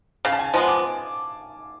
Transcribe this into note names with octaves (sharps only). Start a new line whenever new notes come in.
C#3 F5
A5
G#5
F3 G#3 B3 A5
D6